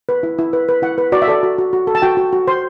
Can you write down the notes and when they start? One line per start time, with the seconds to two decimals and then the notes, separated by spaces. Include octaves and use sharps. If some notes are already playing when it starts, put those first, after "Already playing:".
0.09 B4
0.23 E4
0.39 E4
0.53 B4
0.69 B4
0.82 E4 F#5
0.98 B4
1.12 F#4 D5
1.22 E5
1.28 A4 D5
1.43 F#4
1.58 F#4
1.73 F#4
1.87 A4
1.95 A5
2.02 F#4 G5
2.17 F#4
2.33 F#4
2.48 C5 C6